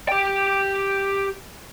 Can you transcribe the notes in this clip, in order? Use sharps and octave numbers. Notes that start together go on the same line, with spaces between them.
G4 G5